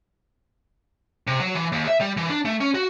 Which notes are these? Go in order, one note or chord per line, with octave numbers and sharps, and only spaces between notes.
C3
F#3
E3
D#2
E5
G3
E3
D4
A3
C#4
F#4